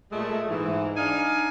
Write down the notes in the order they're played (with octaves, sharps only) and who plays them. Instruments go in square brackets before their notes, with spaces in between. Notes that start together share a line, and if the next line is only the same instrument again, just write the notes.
[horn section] A#2 G#3 A3
G#2 E3
D4 D#4 F5 G#5